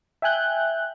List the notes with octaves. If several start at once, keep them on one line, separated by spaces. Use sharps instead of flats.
E5 G5 G#5 F#6 G6